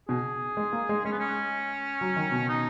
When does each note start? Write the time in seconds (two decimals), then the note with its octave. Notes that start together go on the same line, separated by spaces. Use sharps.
0.08 B2 G#4
0.57 G#3
0.73 A#3
0.89 G#3
1.04 G#3 C#4
1.12 B3
1.19 C#4
2.01 F#3
2.16 D#3
2.32 B2
2.49 D#4